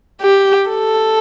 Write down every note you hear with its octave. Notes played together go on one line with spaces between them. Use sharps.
G4
A4